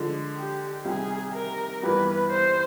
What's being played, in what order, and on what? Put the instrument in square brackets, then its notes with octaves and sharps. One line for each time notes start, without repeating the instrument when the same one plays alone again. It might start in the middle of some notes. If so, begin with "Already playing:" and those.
Already playing: [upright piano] D3 F3 G#3
[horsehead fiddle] G4
[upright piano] C2 C3 D#3 [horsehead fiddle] G#4
[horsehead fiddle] A#4
[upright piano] G2 E3 G3 B3 [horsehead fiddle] B4
[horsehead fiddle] C5